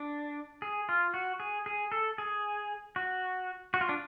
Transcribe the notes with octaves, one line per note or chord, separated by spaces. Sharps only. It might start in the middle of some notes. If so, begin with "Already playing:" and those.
Already playing: D4
G#4
F4
F#4
G#4
G#4
A4
G#4
F#4
F#4
F4
D4